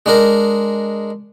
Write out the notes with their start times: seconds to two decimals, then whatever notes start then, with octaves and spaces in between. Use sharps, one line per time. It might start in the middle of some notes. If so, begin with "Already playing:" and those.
0.06 G#3 D4 A#4